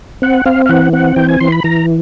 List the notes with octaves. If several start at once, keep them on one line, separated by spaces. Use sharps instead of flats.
C4 F#5
C4 F5
F5
E3 F#5
C4 F#5
E3 G5
G#5
E3 C6
B5
E3 A#5